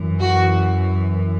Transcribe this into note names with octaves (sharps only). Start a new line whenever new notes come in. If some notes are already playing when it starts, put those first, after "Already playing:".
Already playing: F#2 E3
F#4